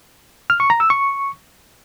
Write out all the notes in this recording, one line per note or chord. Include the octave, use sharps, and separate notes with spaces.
F6
C#6
A#5
E6
C#6